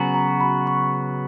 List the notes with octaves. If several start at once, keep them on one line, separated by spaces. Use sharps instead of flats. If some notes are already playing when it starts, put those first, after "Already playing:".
Already playing: C#3 F#3 B3 F#4 G#5 A#5 B5
A#5
B5
C#6